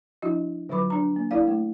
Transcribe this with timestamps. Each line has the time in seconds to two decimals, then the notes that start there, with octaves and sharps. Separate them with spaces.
0.22 F3 D4 E4 F#4 D#5
0.69 D3 F#3 F4 B4 B5 D6
0.90 D4 A#5
1.16 A#3
1.31 E4 A#4 D5 F5
1.47 A3 E4